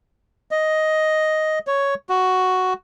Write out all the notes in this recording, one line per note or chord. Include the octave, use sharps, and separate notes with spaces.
D#5
C#5
F#4